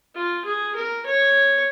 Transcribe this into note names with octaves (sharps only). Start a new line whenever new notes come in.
F4
G#4
A#4
C#5